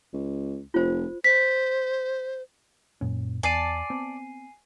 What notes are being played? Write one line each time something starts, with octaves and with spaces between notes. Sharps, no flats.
C#2
F1 F4 C5
C5 B6
F#2 A#2 C#4
E2 D5 G#5 A5 C7 D#7
B3 C4